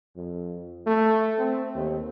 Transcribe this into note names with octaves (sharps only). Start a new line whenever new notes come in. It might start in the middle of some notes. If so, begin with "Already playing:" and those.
F2
A3
C4
D#2